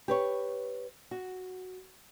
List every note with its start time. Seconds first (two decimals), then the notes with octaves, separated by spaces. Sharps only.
0.08 G4 B4 C#5
1.11 F#4